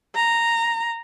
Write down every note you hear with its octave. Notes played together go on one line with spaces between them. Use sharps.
A#5